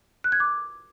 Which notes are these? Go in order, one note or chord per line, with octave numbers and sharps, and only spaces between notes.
F#6
G#6
D6